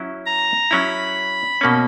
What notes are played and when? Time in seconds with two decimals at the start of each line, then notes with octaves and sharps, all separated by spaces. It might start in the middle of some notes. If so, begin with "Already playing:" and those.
Already playing: F#3 C#4 E4
0.26 A#5
0.70 F#3 C#4 E4 B5
1.61 B2 A#3 C#4